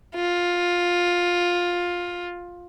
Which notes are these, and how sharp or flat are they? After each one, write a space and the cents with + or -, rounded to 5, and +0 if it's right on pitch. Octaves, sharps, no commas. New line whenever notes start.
F4 +10